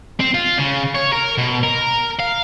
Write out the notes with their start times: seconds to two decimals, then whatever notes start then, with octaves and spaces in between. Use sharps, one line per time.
0.20 C4
0.34 F4
0.58 C#3
0.95 C#5
1.13 A#4
1.38 B2
1.63 A#4
2.20 F5